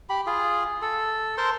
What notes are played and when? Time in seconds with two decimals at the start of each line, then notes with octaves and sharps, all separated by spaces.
0.09 G4 B5
0.27 F4 G#4
0.82 A4
1.38 A#4 C5 A5 C6